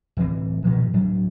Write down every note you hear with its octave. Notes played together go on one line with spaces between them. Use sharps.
D1 E3 C4
G2 A#2 D#3 F3
D1 F#3 D4